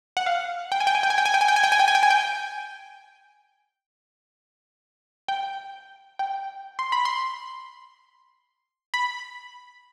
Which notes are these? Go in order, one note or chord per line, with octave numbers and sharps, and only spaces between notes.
F#5
F5
G5
G#5
G5
G#5
G5
G#5
G5
G#5
G5
G#5
G5
G#5
G5
G#5
G5
G#5
G5
G#5
G5
G5
G5
C6
B5
C6
B5